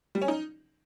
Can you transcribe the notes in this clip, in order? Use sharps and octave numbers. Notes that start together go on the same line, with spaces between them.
G3
C#4
D#4